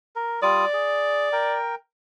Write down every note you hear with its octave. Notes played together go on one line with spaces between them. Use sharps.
A#4
G3 F4 D5 D#6
G#4
A#4 G5